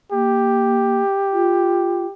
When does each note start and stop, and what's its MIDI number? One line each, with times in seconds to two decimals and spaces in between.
0.12 1.02 58
0.12 2.13 67
1.33 2.06 65